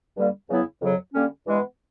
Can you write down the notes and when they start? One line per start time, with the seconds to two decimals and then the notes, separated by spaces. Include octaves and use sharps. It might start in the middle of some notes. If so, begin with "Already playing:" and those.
0.17 G2 D3 G3 A#3
0.50 E2 C#3 F#3 B3 E4
0.82 F2 C#3 F#3
1.14 D3 G3 A#3 C#4
1.46 G2 E3 G#3 B3